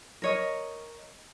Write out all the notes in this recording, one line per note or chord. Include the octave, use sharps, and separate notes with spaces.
A#4 C#5 D#5